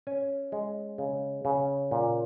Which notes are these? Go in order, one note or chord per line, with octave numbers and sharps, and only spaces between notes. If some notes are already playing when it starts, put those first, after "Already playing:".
C#4 G#5
G#3
C#3
C#3
A#2